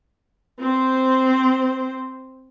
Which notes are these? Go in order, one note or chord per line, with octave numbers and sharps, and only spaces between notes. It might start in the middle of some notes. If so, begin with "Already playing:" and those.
C4 C5